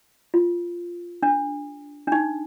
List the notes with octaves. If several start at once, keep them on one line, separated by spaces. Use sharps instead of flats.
F4
D4
D4
D#4